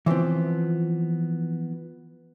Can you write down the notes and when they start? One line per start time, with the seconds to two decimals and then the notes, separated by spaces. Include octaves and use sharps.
0.06 E3 F3 B3 C4